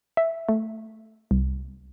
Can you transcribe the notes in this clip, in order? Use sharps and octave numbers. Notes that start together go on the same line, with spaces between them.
E5
A3
C2